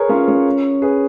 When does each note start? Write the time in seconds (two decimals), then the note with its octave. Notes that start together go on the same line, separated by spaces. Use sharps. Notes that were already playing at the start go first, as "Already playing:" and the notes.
Already playing: G#4 A#4 B4 C#5
0.09 C#4 F4
0.28 C#4
0.82 G#4 B4